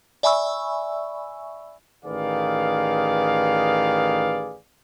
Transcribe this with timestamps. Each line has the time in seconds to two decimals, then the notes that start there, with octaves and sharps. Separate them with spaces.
0.23 D5 E5 G#5 B5 C#6 E6
2.05 A1 D#3 G#4 B4 D5 F5